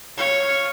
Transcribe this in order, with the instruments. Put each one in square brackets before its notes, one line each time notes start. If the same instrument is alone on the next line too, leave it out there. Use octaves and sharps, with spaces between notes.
[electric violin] C#5 [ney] F5